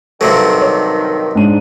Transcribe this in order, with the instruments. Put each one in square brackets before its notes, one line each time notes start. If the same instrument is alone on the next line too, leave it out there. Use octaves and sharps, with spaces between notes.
[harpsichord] G2 C3 F#3 [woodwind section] D#3 [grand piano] A4
[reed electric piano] C#5
[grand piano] G#2 D4 D#7